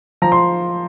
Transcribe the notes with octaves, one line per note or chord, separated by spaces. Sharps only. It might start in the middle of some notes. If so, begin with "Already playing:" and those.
F3 A#5
C6